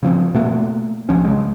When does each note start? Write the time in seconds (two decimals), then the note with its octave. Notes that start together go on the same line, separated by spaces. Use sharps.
0.03 C#3 F3 C4
0.34 B2 A3 A#3
1.09 B1 F3 C#4
1.25 C#3 G#3